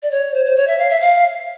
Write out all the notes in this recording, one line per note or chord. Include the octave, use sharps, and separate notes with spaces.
D5
C#5
C5
C5
C#5
E5
F5
E5
F5